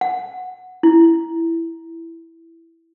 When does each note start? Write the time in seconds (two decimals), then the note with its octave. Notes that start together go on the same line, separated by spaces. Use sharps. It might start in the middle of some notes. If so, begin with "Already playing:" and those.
0.01 F#5
0.83 E4